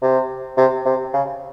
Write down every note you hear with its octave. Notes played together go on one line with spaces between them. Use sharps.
C3
C3
C3
C#3